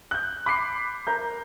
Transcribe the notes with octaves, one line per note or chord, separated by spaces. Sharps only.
F#6 G6
B5 D6 C7
A#4 A#5 G6